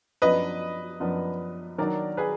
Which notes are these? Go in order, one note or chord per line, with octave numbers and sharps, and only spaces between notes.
F#2 F3 B3 D4 B4 D#5
F#2 F3 B3 D4
D#3 F#3 D4 A#4 D5
G#4 B4